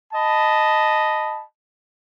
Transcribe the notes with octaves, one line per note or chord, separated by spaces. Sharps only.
D#5 A5 B5